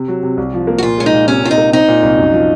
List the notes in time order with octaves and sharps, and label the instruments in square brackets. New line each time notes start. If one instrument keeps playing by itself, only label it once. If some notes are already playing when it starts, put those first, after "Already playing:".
Already playing: [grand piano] C3
F#3
C3
C2
F3
A#3
[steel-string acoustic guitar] F#4
[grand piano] A#2 [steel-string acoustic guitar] F4
[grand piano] G#3 [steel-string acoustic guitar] C#4
[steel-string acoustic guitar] D#4
[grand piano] A#2
[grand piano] C3 [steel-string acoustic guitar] C#4
[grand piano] C3 [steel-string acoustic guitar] F4
[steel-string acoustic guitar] D#4
[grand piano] A#3
[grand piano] C4 [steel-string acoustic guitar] D#4
[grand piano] A#2
C2
F#2
F3